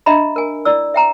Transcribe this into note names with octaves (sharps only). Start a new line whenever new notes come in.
D4 G4 D#5 E5 A#5 B5
A#4 G#5
E4 D5 E6
E5 G5 A#5